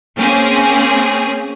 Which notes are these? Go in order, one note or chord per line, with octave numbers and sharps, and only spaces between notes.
A#3 C4 C#4 G#4